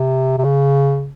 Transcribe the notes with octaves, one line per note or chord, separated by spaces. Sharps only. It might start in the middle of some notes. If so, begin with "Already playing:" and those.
Already playing: C3
C3
C#3